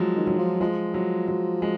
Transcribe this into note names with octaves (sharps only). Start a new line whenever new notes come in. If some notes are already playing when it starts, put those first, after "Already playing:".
Already playing: F3 F#3 G#3
D#3
F#3
F3
F3 G#3
F#3
F#3
G#3